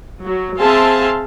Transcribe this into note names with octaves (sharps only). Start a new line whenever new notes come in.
F#3
C4 G#4 E5 F5 A5 C6